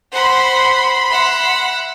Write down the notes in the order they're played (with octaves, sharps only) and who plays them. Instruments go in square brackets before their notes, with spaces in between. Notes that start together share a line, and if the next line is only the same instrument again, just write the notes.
[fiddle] C5 F#5 [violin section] B5 C6
[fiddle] E5 F#5